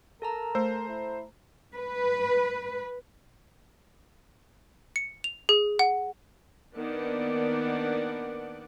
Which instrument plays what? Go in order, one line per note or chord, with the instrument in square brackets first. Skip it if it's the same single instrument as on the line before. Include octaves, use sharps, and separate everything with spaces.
[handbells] A4 A5 A#5 [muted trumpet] A#4
[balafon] A3 [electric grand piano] C5
[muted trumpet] E4
[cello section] B4
[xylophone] C#7
F7
G#4
F#5
[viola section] D#3 A#3 B3 D4 D5 F#5